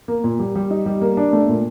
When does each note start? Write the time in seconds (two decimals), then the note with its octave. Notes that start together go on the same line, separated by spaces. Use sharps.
0.08 A#3
0.24 A#2
0.39 G3
0.55 G3
0.71 D#4
0.86 G3
1.01 A#3
1.17 D4
1.33 A3
1.49 A#2